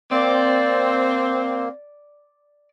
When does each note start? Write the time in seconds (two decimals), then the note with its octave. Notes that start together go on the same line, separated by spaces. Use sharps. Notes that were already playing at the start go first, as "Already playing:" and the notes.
0.12 A#3 C4 D5